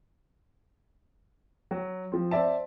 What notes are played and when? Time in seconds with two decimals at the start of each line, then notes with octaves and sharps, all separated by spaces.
1.71 F#3
2.12 F3 C4
2.31 C4 C5 D5 E5 A5